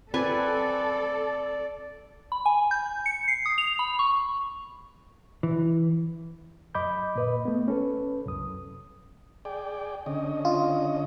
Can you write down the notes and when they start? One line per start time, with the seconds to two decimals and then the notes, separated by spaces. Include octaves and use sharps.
0.14 C4 A4 B4 D5 G#5
2.32 B5
2.46 G#5
2.71 G6
3.06 C#7
3.28 C7
3.46 D#6
3.58 F7
3.79 B5
3.99 C#6
5.43 E3
6.75 F#2 D#5 B5 D6 G6
7.16 A#2 B4 D#5
7.45 A3 B3
7.68 C#4 A4 B4
8.26 C2 F#2 D#6
9.45 G#4 D5 G5
10.06 D3 C#4 D#5
10.45 F4